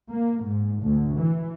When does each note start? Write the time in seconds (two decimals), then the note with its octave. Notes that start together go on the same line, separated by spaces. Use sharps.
0.11 A#3
0.43 G#2
0.82 D2
1.18 E3